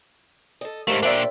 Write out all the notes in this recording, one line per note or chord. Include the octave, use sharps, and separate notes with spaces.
A4 D#5
F2 G#2 G3 A3 A#4 F5
A#2 D4 A#4 C5 D5 E5 G5